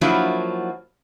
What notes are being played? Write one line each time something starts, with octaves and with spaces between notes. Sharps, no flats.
F3 F#3 A#3 D4 E4 F#4